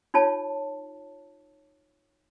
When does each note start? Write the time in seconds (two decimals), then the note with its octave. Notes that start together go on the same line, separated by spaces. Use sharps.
0.14 D#4 F4 C#5 A5